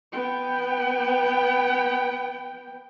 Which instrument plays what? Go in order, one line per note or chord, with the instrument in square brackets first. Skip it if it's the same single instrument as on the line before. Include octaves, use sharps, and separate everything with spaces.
[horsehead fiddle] B3 G5